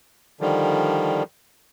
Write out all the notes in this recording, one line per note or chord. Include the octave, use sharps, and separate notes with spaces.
D3 D#3 F3 G3